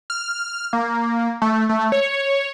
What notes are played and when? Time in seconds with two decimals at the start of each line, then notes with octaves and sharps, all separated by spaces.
0.10 F6
0.73 A#3
1.42 A3
1.69 A3
1.92 C#5